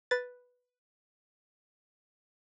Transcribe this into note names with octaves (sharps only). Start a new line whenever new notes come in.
B4 A6